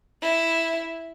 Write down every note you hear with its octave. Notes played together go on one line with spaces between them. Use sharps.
E4